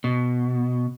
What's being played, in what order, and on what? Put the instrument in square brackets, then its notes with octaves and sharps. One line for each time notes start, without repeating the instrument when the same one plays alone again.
[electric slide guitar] B2